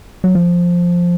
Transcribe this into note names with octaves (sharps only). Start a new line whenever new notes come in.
F#3
F3